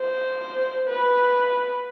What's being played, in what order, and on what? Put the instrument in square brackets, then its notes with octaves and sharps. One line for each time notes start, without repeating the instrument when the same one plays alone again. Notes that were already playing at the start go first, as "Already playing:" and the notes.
Already playing: [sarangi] C5
B4